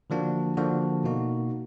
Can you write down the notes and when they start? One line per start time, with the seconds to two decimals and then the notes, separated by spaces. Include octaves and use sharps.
0.10 D3 F3 A#3 D4 F#4
0.57 D3 F3 A#3 D4 F#4
1.04 B2 A#3 D#4 F#4